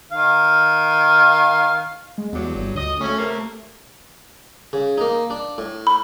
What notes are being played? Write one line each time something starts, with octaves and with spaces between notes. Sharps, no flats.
D#3 F5
G#3
E2 G2 F#3
G1
D2 D#5
F#3 A3 C#4
C3 A#3
C#3
A#3 D#4
D4
A2
B5